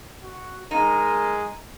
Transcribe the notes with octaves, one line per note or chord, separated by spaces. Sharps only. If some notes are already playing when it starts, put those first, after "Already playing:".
F#4
G#3 D#4 A#4